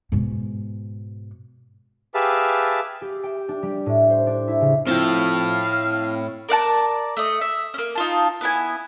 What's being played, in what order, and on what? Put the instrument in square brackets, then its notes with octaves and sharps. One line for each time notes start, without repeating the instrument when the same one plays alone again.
[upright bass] G#2 B2
[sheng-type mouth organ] G4 G#4 B4 E5 F5 A5
[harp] G4
G5
D4
G3
A2
C5
D4
E4
C#3
[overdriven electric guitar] A2 A4 [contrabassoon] F3 [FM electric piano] C4 E4 G5 [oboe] F5
[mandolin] A#4 D5 F#5 A5
A3 D#5
E5
A#3 C#4
D#4 F4 A5
B3 E4 G#5